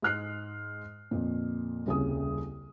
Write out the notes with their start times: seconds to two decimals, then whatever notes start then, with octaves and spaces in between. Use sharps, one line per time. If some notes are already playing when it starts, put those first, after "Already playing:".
0.02 G#2 G#3 F6 F#6 C7
1.11 F2 A#2
1.86 D#1 C2 C#3 G#4 D#6